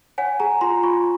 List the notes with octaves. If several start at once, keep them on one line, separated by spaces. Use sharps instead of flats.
C#5 F#5 G#5
G#4 G#5 A#5
F4 A#5 C6
F4 B5 C#6